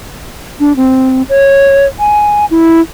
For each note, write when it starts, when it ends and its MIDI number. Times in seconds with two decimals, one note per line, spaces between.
0.60 0.75 62
0.76 1.22 60
1.29 1.86 73
1.99 2.45 80
2.51 2.80 64